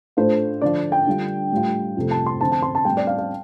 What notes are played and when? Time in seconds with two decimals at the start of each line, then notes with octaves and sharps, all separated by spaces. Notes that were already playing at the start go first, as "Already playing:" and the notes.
0.17 A2 A3 D4 F4 C5
0.61 D3 F3 D4 F4 D5
0.92 G5
1.07 D3 G3 F4
1.52 A2 G3 F4
1.97 F2 C3 A3
2.11 A5
2.26 C6
2.41 D3 F3 C4 A5
2.52 A5
2.62 C6
2.75 A5
2.85 A2 G3 C4 G5
2.97 D5
3.07 F5
3.18 F5